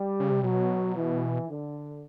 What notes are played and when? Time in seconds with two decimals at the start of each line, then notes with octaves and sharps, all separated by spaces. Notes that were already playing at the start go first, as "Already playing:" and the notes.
Already playing: G3
0.20 C#3
0.31 C3
0.43 B2 F#3
0.96 E3
1.49 D3